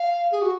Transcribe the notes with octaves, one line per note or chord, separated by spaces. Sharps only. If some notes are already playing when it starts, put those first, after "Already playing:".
Already playing: F5
G#4
F#4